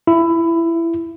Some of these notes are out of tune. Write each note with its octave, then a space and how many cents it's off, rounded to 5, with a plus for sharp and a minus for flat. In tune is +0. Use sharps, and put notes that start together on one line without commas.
E4 +15